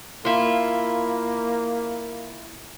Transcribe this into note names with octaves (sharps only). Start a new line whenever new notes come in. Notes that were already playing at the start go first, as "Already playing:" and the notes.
A#3 E4 F4